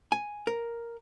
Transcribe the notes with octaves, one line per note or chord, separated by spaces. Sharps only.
G#5
A#4